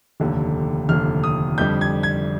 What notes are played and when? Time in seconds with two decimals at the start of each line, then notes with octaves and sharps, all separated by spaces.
0.20 F1 D#2 D3
0.89 F1 D#2 D3 F6
1.24 D#6
1.58 F2 D3 G3 D4 G6
1.81 G#6
2.03 G#6